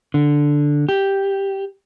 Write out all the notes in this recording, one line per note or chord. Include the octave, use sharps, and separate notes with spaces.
D3
G4